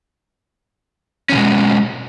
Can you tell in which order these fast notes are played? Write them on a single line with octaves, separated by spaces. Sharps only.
C#4 D#3 B2 G#3